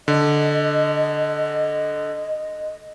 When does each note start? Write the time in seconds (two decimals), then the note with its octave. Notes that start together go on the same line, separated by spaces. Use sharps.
0.08 D3 D#5